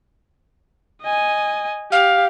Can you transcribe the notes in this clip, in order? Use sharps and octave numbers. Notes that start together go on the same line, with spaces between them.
D#5 G#5
G4 F5